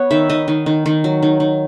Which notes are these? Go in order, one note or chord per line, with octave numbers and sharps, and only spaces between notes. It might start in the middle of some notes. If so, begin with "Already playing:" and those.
Already playing: B3 C#5
D#3 E5
D#3 D#5
D#3
D#3
D#3
F#3
D#3
D#3